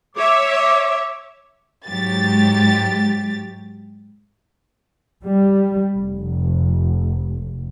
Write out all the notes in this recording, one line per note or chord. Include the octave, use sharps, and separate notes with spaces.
C#5 E5 D6
G#2 F#3 G4 A6
G3
F1